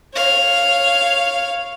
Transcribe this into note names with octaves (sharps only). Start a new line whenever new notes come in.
C#5 F5